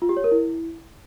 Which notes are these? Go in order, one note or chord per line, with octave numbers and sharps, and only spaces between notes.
F4
G4
C#5
A#4
E4